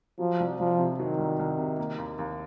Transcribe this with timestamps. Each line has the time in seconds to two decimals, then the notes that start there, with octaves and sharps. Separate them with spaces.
0.19 F3 F#3
0.40 C2
0.59 C2 F3
0.79 C3
0.99 D#3 F#3
1.19 C2
1.39 C2
1.58 C3
1.79 A#3
1.98 D#2
2.18 D#2